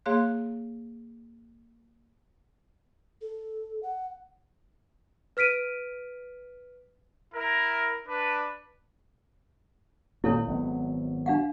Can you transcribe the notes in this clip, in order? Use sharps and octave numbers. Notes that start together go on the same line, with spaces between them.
A#3 G#4 C#5 F5 C6 F#6
A4
F#5
B4 F6 B6 D7 D#7
E4 A#4
D4 B4
G#1 A#2 A#3 E4 A4 C#5
G#1 F#3 B3
D4 F5 F#5